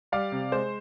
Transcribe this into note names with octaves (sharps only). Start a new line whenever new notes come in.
G3 D5 F5
C3
G#3 C5